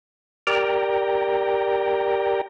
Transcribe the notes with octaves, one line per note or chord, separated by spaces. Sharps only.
G4 A#4 D5 G5 A#5